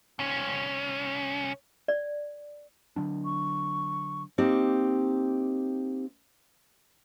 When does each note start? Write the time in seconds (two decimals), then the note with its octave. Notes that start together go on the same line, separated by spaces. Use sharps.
0.19 C2 C#4
1.88 D5
2.96 D3 F#3 D4
3.25 C#6
4.38 A#3 C4 D#4 G4